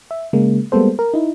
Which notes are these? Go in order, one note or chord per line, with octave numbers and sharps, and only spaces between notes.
E5
C#3 G#3 A#3
G3 G#3 A#3 B3 A4 C5
A#4
D#4 E4